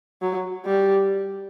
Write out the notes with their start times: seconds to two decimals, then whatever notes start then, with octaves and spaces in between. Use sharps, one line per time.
0.22 F#3
0.66 G3